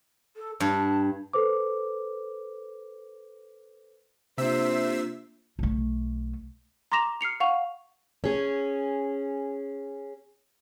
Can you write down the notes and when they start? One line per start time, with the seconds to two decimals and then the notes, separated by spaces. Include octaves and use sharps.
0.37 A4
0.60 G2 A5
1.33 A4 B4 C5 D6
4.38 C3 A#3 D4 F4 C5 E5 E6
5.59 B1 A3
6.92 A#5 C6 D6 A#6 E7 F7
7.21 F6 C7 C#7 F7
7.40 F5 F#5 C#6 F7
8.24 C#4 G#4